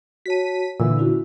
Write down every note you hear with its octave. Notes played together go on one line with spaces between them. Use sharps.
F#4 C#5 A5 B6 D#7
A#2 D3 E3 E6
C#4 E4 F#4